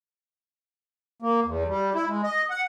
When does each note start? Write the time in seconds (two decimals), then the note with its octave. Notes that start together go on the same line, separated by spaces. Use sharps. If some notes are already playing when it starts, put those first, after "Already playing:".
1.22 A#3
1.45 E2
1.68 G3
1.94 E4
2.07 G#3
2.23 D#5
2.50 F#5